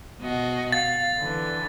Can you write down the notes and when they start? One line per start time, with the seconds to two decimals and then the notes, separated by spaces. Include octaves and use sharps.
0.20 B2 F#4 D#5
0.72 F5 A6
1.17 D3 E3